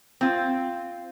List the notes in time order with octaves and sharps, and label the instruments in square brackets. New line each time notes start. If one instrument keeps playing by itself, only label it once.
[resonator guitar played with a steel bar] C4 F4